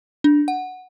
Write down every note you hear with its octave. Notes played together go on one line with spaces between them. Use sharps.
D4
F#5